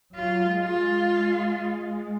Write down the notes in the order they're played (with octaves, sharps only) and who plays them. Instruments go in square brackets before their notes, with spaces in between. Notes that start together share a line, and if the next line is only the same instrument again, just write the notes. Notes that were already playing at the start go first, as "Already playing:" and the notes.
[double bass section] F#3 [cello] F4
[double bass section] G#3
[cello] F4
[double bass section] G#3